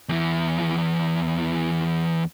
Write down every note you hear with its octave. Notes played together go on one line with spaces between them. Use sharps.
E2 E3